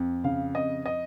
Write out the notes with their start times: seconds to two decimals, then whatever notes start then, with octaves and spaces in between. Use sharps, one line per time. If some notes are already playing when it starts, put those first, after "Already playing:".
Already playing: F2
0.24 C#3 F5
0.55 F2 D#5
0.86 D#5